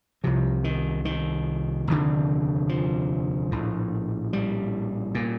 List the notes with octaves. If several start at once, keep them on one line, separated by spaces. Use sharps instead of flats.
C2 C3 F3
D#3
D#3
F1 D#2 D3
F3
A#1 A2
G3
A#2